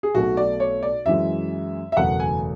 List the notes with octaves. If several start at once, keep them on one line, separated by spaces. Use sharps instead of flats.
G#4
B1 B2 A3 F#4
D5
C#5
D5
F#2 E3 G#3 E5
E5
F#1 E2 B2 A3 F#5
G#5